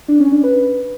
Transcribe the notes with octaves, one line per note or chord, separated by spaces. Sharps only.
D4
C#4
D4
B4